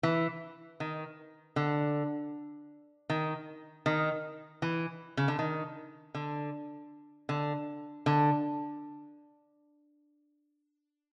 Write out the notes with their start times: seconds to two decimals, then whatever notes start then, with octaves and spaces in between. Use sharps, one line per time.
0.03 E3
0.80 D#3
1.56 D3
3.10 D#3
3.86 D#3
4.62 E3
5.17 C#3
5.28 D3
5.39 D#3
6.15 D3
7.29 D3
8.06 D3